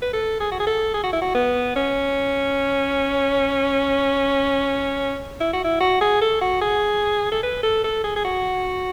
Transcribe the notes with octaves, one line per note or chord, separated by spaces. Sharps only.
B4
A4
G#4
F#4
G#4
A4
G#4
F#4
E4
F#4
B3
C#4
E4
F#4
E4
F#4
G#4
A4
F#4
G#4
A4
B4
A4
A4
G#4
G#4
F#4